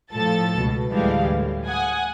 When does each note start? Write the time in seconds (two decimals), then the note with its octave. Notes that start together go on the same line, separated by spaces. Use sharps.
0.13 A2 F3 A4 A5 A6
0.57 C#2 B2
0.93 D2 A2 E3 G3 G#3 F5
1.30 A2
1.67 F#5 G#5 D#6